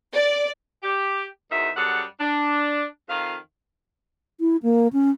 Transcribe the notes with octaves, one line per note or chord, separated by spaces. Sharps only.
D5
G4
E2 G#2 D#3 D#4 F#4 E5
F#2 G3 G#4 A4 F#5
D4
F2 D#3 F4 F5
E4
A#3
C#4